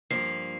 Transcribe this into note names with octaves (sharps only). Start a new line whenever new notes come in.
G2 F3 A#3 C7